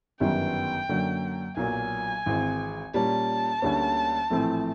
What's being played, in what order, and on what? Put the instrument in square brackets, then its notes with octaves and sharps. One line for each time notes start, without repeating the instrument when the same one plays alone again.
[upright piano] G1 F#2 D#3 G3 B3 [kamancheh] G5
[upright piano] F#2 D3 F#3 A#3
[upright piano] B1 A#2 F#3 A#3 [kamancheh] G#5
[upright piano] G#1 G#2 E3 G#3 C4
[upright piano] A#2 G3 A#3 C#4 [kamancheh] A5
[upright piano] D2 D3 G3 A#3 C#4
A#1 A2 E3 A3 C4